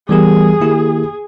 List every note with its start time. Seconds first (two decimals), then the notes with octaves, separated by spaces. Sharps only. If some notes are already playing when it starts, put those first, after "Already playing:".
0.08 E3 G3 B3 G4 G#4 A#4
0.60 D#3 A#3 E4 G4